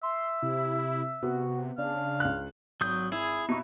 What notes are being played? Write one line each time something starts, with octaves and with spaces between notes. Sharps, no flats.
E5 C6
C3 E4
C3 B3 F#4
C#3 D4 F5
C#2 F#6
G#1 F#3 D#6 G6
E4 G#4
B2 D#4 C#6